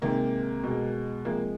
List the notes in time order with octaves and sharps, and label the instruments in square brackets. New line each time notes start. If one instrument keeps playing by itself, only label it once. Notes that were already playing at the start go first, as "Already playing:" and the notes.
[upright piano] C3 D#3 G#3 A#3
B2 G#3
C3 F3 G#3 A#3